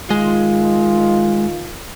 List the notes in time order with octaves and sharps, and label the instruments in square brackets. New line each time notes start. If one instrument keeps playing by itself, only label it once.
[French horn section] D#3 F4 [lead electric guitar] G#3